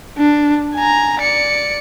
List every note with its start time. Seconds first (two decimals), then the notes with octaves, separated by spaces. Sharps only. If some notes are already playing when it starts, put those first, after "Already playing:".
0.18 D4
0.75 G#5 A#5
1.20 D5 C#7